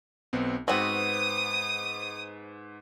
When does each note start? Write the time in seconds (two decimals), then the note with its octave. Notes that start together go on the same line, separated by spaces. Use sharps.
0.33 B1 B3 C4
0.68 G#2 B3 C4 F#4 B4 C#6 D#6